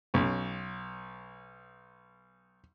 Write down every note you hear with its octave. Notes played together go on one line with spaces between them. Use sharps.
B1 C#4